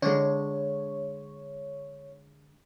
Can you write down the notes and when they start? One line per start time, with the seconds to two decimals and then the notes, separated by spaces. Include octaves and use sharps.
0.02 D3 G#3 C#5